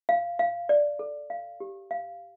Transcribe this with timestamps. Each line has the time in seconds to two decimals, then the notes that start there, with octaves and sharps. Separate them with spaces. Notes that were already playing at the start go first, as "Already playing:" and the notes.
0.09 F5
0.39 F5
0.69 D5
0.99 A4
1.30 F5
1.60 G4
1.91 F5